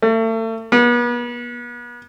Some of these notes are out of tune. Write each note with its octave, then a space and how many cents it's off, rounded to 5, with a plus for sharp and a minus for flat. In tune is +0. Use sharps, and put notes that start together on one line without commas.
A3 +35
B3 -40